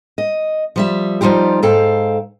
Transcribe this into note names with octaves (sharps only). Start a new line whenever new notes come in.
D#5
F3 G3 E5
F3 G3 D#4 F4 G4
G#2 A4 F5 G5